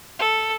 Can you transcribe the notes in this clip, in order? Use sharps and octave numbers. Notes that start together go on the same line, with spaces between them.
A4